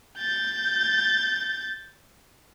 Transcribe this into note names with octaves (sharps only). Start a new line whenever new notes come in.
G6 A6